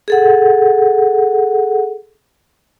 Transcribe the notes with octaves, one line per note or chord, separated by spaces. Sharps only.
G#4 A4 F#5